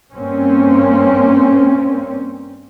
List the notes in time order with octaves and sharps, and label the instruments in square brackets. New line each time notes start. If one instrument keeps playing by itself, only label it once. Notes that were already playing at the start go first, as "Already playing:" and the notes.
[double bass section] G2 A#3 C4 C#4